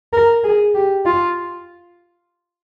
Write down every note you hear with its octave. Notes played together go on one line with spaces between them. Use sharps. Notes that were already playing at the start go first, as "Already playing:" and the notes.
A#4
G#4
G4
F4